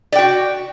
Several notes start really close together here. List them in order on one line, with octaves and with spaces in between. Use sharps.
D5 G5 F#4